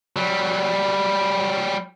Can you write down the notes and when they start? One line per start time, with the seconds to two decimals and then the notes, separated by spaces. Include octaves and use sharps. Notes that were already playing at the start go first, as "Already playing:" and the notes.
0.16 F#3 G3